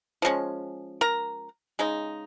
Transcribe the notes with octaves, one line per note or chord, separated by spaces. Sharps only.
F3 G#3 C#4
A#4 A#5
C#3 G#3 D#4